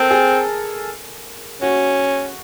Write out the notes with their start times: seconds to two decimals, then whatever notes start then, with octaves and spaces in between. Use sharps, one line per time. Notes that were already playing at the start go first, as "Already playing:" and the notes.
Already playing: C4 A4 A#4
0.11 G#4
1.62 C#4 F#4